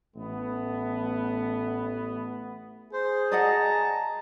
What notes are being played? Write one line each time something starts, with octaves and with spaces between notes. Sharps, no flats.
A1 A3 B3
G#4 C5
D5 D#5 F#5 A5 A#5